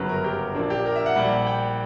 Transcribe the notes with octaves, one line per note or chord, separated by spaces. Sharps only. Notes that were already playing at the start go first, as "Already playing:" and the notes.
Already playing: G1 F#2 C#3 F#3 B4
A#4
G4
A#1 A#2 A#3 D4
G4
A#4
E5
F#5
A#1 A#2 G3
G5